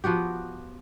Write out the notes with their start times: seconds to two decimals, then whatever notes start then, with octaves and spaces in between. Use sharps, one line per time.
0.04 F3 B3 F#4 G4